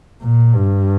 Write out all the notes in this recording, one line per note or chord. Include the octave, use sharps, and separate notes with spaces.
A#2
G2